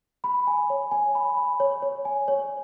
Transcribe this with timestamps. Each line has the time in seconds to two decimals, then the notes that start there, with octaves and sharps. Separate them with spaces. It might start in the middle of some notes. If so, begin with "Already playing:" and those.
0.24 B5
0.47 G#5
0.70 C#5
0.91 G#5
1.15 B5
1.37 B5
1.60 C#5
1.83 C#5
2.05 G#5
2.28 C#5